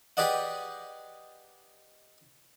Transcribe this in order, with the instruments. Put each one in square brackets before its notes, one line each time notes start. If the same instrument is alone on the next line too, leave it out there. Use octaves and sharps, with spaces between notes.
[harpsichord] G4 G#4 B4 D5 D#5 F#5